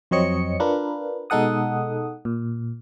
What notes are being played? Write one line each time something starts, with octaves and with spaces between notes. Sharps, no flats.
F2 F#3 C4 C#5 D#5 C#7
D4 F4 A#4 B4
B2 G#3 D#4 A4 F#5 D#6
A#2